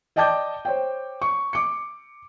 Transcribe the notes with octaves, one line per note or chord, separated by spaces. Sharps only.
D5 D#5 G5 A5 D6 G6
C5 C#5 G5
C#6
D6 C#7